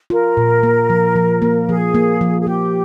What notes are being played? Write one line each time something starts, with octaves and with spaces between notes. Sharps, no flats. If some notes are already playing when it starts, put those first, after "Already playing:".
F4 A#4
A#2
A#3
F3
F3
A#3
F3 G#4
A#3
F3
G#4
A#3 G4